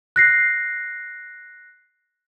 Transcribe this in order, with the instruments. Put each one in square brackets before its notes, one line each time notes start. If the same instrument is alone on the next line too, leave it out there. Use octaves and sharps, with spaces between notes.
[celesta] F#6 A#6 C7